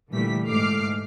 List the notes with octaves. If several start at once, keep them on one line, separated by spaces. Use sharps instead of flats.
A#2 D3 E3 G3 A3 B6
G#2 A3 D6 F6 C7